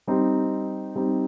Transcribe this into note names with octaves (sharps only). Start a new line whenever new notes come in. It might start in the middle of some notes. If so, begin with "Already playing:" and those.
G3 C4 D#4
G3 C4 D#4